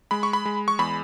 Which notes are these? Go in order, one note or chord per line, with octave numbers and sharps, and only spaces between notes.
G#3 B5
C#6
B5
G#3
C#6
E2 B5